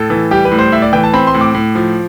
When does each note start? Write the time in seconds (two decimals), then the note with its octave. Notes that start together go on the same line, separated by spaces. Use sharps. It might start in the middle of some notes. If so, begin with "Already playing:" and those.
Already playing: A2 A4
0.10 E3
0.31 G3 G4
0.45 B4
0.52 A2
0.59 C5
0.72 A2 E5
0.82 D5
0.93 E3 G5
1.04 A5
1.13 C4 B5
1.27 C6
1.34 A2
1.41 D6
1.54 A2
1.75 F3